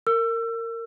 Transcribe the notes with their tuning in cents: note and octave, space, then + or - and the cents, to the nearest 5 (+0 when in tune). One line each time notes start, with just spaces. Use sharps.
A#4 -20 E6 +30